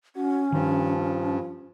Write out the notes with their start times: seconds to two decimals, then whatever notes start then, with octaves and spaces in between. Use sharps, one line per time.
0.16 C#4 F#4
0.52 G2 D#3 F3